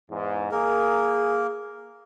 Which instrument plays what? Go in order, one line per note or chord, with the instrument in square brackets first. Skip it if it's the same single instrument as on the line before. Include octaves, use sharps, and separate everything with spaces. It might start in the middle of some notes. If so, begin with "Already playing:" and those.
[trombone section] E2 G#2
[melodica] A#3 A#4 [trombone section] G#4